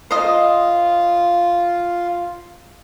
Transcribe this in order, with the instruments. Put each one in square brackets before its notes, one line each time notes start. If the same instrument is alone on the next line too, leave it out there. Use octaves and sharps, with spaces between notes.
[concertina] F4 [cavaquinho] C5 D#5 C6